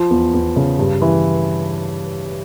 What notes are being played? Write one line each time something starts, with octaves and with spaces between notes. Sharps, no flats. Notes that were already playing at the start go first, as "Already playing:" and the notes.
Already playing: F3
E2
E2
C#3
G2
E3